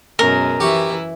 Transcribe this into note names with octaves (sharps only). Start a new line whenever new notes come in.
F#2 B2 G#3 A#4
E3 E4 G4 C#6